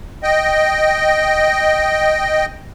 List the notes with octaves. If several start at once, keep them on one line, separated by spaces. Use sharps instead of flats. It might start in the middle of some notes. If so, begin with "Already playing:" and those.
D#5 G5